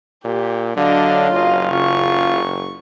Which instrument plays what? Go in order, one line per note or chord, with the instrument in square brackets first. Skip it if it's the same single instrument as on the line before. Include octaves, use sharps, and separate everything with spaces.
[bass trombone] A#2 [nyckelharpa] G4
[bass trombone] D3 [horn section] F#3 F5 [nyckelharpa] D4 D#5
[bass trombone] F#1 [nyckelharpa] F4 D#5
[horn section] C#3 F4 [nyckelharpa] C#6